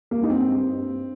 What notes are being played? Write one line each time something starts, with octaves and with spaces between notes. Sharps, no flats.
A#3
G2 D#4
C4
G2